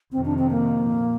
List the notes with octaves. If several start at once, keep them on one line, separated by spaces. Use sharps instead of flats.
F2 C3 D#3 C4
D4
C4
A#3
A#2